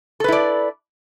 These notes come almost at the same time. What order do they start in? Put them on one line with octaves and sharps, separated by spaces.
A4 B4 E4 D5